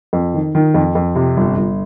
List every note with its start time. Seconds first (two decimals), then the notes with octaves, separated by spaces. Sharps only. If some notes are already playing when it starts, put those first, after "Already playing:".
0.13 F2
0.34 D#3
0.55 D#3
0.74 F2
0.95 F2
1.15 C3
1.37 G1
1.57 G1